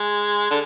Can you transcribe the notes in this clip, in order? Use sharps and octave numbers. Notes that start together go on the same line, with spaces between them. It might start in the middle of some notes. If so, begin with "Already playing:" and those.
Already playing: G#3
D3